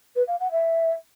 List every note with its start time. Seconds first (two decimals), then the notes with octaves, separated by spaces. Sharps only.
0.15 B4
0.27 F5
0.39 F#5
0.51 E5